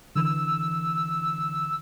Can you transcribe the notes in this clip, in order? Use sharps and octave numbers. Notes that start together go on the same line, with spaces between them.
D3 E3 E6